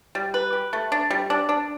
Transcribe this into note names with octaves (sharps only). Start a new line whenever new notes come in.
G3
B4
G4
A3
D4
G3
D4
D4